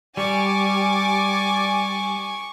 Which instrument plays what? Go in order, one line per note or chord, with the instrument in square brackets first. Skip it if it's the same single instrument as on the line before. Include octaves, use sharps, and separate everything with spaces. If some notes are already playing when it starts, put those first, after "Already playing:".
[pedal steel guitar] G3 [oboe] D5 [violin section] G#5 D6 [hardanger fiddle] C#6